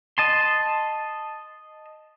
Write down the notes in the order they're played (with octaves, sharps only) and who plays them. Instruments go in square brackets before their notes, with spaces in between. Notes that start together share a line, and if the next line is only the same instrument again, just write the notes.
[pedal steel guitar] D#5 A5 C6